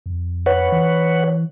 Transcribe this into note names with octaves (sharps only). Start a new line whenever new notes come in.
F2
B4 C#5 F#5
E3